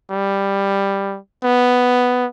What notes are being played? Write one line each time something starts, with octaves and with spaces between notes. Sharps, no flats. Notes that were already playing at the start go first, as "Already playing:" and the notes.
G3
B3